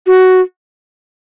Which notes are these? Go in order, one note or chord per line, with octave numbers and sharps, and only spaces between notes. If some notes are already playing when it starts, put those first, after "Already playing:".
F#4